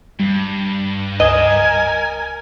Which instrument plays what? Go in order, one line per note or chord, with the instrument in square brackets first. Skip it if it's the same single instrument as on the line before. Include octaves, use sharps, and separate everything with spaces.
[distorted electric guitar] G2 [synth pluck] G3
[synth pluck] C#2 E7 [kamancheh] A#4 G#5 [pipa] D#5